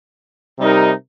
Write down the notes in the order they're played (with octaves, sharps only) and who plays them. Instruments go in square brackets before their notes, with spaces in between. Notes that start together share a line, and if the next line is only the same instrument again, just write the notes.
[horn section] C3 G3 D#4 A#4